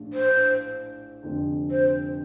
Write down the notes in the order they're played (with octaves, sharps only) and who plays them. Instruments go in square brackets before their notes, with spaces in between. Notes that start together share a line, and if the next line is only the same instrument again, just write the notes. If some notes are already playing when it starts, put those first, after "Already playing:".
Already playing: [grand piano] A#1 A2 A3 D4
[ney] C5
[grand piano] F1 F2 D3
[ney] C5